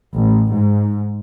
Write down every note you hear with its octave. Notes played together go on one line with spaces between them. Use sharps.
A1
G#2